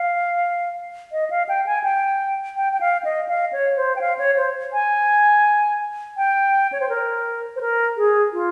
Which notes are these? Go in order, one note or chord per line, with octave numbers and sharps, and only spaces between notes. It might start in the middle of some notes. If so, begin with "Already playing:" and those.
Already playing: F5
D#5
F5
G5
G#5
G5
G5
G5
F5
D#5
F5
C#5
C5
G5
F5
C#5
C5
G#5
G5
C#5
C5
A#4
C5
A#4
G#4
F4